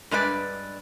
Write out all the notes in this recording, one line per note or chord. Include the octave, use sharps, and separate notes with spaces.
G2 G#3 B4 D5